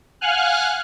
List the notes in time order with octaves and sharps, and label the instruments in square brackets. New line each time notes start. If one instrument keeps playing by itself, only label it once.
[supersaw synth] F5 F#5 G#5 F6 F#6